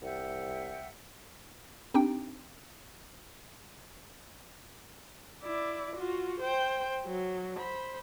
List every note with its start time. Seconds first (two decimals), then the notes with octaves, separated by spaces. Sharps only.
0.02 C2 E5 F#5 G5
1.94 C4 D4 D#4 G4 G5
5.43 E4 D5
5.96 F4 F#4
6.40 C5 G5
7.06 F#3
7.55 C5 B5